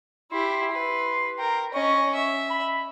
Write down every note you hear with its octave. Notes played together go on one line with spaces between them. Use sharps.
E4 G4 C6
B4
A#4 G5
C#4 D#5 C#6
E5
B5